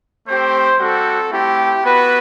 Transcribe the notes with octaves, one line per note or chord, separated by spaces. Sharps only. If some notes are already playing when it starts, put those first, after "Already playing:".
A3 C4 G4 C5
G3 C4 F#4 A4
A3 C4 E4 G4
B3 F#4 B4